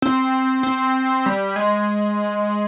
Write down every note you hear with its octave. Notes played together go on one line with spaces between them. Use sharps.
C4
C4
G3
G#3